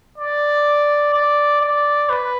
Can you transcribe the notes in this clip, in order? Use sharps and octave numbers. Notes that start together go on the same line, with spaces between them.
D5
D5
D5
B4